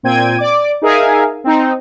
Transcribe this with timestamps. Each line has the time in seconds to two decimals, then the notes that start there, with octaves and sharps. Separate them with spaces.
0.03 A#2 C4 G5 G#6 D#7
0.38 D5 D6
0.82 D#4 G#4 A#4 E5 F5 G#5
1.44 C4 D#4